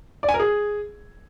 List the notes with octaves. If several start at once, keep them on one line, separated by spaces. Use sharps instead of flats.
D5
G#5
A#4
G#4